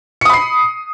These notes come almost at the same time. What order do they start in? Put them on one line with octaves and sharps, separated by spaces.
C#7 D#6 B5 C7